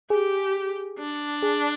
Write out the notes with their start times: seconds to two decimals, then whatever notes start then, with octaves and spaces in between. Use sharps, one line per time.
0.10 G4 G#4
0.99 D4
1.42 G#4